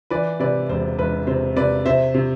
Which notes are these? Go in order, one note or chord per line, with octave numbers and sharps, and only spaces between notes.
E3 B4 D5
C3 B4 D5
E1 C5
E1 B4
C3 C5
C3 B4 D5
C3 C5 E5
C3